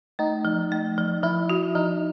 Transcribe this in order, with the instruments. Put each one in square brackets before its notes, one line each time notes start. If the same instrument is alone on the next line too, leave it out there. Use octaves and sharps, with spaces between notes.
[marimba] A3 [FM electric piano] D#4
[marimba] F3
A3
F3
[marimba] F3 [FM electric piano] E4
[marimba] F#4
[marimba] F3 [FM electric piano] D#4